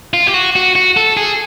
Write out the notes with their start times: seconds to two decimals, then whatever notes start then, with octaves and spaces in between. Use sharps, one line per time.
0.13 F4
0.27 G4
0.34 F#4
0.56 F#4
0.76 F#4
0.97 A4
1.17 G#4